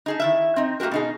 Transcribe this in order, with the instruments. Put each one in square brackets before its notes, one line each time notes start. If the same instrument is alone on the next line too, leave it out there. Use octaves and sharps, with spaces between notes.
[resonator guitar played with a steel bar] D#4 G#4 A4
D#3 E4 E5
C4 D#4
A3 A#3 F#4 G4 A#4
B2 D#4 G#4